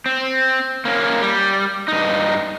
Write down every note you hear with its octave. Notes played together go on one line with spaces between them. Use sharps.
C4
A#3 C#4
G3
G2 D#4